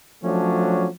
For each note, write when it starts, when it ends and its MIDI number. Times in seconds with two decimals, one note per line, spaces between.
0.24 0.88 53
0.24 0.88 54
0.24 0.88 57
0.24 0.88 61
0.24 0.88 62